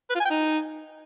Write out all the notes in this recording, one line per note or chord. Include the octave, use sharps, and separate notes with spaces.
B4
F4
G#5
G5
D#4